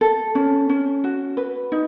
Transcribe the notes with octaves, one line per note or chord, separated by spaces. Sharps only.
A4
C#4
C#4
F#4
B4
D#4